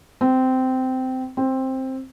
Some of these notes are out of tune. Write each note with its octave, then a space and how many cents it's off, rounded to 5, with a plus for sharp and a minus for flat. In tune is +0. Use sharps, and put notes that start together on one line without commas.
C4 -15
C4 +10